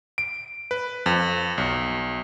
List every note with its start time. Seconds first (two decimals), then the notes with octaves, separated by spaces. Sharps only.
0.18 D7
0.71 B4
1.06 F2
1.58 B1